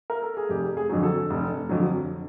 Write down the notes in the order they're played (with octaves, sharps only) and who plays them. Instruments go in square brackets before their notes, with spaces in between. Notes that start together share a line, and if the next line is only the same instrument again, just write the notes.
[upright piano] A#4
A4
G#4
F1 G4
G#4
F2 D3 F#3
A4
F1
F2 D3 F#3